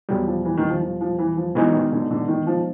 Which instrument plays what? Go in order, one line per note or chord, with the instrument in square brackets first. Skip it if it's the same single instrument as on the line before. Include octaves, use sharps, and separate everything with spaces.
[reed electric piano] E2 B2 G3 [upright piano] F#3
[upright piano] F3
E3
D#3
F3
F3
F3
E3
F3
[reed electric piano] B2 G#3 B3 D#4 [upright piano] E3
[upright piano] D#3
D3
D3
D#3
F3